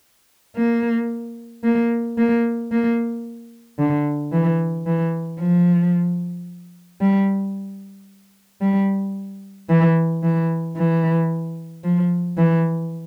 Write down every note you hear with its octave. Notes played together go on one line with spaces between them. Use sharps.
A#3
A#3
A#3
A#3
D3
E3
E3
F3
G3
G3
E3
E3
E3
F3
E3